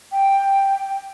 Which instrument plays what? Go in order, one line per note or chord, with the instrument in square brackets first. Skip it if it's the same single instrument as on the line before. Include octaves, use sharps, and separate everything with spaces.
[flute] G5